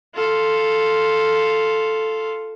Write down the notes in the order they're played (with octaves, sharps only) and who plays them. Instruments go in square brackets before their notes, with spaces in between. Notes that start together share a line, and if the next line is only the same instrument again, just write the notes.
[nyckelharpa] F4 A4